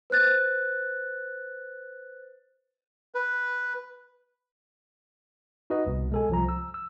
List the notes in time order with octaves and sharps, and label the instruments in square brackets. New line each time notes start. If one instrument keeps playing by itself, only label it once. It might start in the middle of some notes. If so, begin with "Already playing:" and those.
[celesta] B4 C5 F#6 A6
[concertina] B4
[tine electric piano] D#4 F#4 B4 D#5
C2 B2
G#3 A4 G#5
C2 F3 A#5
E6
E6